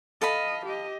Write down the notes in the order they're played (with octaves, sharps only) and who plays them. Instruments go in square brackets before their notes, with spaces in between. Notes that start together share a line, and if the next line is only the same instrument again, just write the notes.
[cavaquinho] A4 F5 B5 [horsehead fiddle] D#5
[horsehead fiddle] G4 D#5